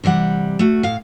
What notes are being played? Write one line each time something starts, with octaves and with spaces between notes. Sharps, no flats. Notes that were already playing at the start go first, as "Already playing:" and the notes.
C3 E3 G3 F#5
A3 F#4
A2 F5